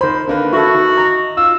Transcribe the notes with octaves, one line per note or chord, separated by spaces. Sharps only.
D#3 C5 B5
D3 A#3 B4
E4 F#4 A4
D#3
D#4 A#5
F4 E6